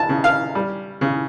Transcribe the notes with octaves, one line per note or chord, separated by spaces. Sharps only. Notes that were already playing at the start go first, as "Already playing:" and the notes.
Already playing: A5
C#3
F5
G3
C#3